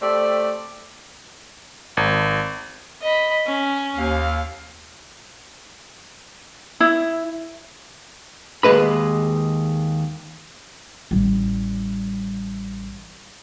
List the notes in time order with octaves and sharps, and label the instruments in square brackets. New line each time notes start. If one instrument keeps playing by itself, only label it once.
[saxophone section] A3 C4 G4 D5
[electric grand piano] G#1
[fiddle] D#5 B5
C#4
[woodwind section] D#2 [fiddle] F5
[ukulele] E4
[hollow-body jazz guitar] D#2 G#2 G#3 B4 B5
[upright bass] A1 G3